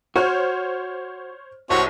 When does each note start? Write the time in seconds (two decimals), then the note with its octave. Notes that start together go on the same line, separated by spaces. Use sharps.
0.16 F#4 C5 C#5 F6
1.70 C2 C4 F#4 C#5